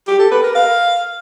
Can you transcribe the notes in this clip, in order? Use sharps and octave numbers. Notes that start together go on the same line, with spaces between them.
G4
A4
B4
A#4
F5